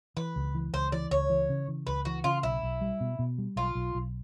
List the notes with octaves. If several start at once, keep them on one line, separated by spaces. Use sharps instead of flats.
E3 B4
C#2
E3
C#2 C5
E3 D5
C#2 C#5
E3
C#3
E3
C#2 B4
E3 F#4
C#3 F4
B1 E4
B1
G3
B2
B2
G3
B1 F4
B1
B1